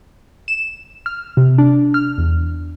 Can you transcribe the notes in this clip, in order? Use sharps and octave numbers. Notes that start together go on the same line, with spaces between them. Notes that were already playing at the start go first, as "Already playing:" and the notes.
E7
F6
C3
D4
F6
E2